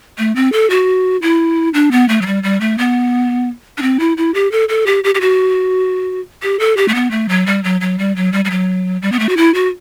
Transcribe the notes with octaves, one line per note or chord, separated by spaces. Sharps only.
A3
C4
A4
F#4
E4
D4
B3
A3
F#3
G3
G3
A3
B3
D4
C4
E4
E4
G4
A4
A4
G4
G4
G4
F#4
G4
A4
G4
A3
B3
A3
F#3
G3
F#3
F#3
G3
F#3
G3
G3
F#3
G3
B3
A3
F#4
E4
F#4